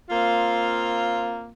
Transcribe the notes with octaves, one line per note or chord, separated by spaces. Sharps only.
A#3 C4 F4